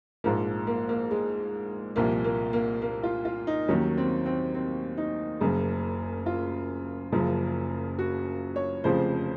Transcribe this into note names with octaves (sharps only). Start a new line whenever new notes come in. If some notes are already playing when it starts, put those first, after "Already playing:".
A#1 G#2 F3 A#3
A#3
A#3
G#3
C2 A#2 F3 A#3
A#3
A#3
A#3
F4
F4
D#4
D#2 D#3 F#3 C#4
C4
C4
C4
D#4
F#1 F#2 C#3
F4
F#1 F#2 C#3 F3
F#4
C#5
F1 F2 C#3 F3 C5